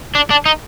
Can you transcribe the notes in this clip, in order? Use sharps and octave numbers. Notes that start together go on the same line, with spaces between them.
D4
D4
D#4